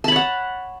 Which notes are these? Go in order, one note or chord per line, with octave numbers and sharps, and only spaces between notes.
C#5 F#5 A5 B5